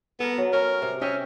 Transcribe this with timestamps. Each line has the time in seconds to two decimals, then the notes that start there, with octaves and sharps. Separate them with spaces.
0.20 B3 A4 A#4
0.38 F#3
0.53 C#4 A#4
0.82 C3
1.01 C#4 D#5 E5 G5